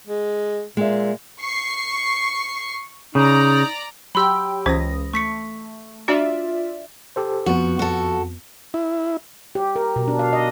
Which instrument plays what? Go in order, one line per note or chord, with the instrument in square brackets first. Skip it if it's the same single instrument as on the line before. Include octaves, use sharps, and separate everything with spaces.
[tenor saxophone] G#3
[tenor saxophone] A#2 [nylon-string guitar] G#3 E5
[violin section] C#6 C7
[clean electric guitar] C#3 [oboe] D#4 [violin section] D5 A#5
[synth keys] F#3 G4 G5 [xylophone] B5 C6 E6
[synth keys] C#2 D#6 A#6 [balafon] E3 C#4 C5
[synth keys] A3 [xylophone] C#6 B6 C#7
[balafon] D4 F#4 [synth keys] F4 D5 E5
[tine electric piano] G4 A4 C5
[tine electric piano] F2 [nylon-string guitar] F3 B3 [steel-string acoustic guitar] F#4
[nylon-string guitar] F3 [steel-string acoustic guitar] F#4 A4
[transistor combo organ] E4
[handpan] G4
A#4
B2
D4
F5
D#5